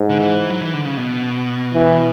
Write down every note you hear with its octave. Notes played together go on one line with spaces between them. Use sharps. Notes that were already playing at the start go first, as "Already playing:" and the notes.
Already playing: G#2
D3
E3
F#3
E3
D3
C#3
B2
E3